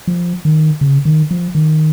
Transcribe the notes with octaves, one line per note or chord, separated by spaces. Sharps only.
F3
D#3
C#3
D#3
F3
D#3